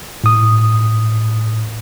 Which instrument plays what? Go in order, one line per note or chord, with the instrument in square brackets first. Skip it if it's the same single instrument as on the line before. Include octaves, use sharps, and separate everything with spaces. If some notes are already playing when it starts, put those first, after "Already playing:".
[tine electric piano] A2 D#6